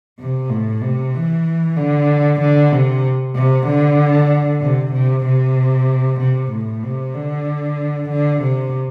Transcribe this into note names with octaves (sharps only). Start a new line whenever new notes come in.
C3
A2
C3
E3
D3
D3
C3
C3
D3
C3
C3
C3
C3
A2
C3
D3
D3
C3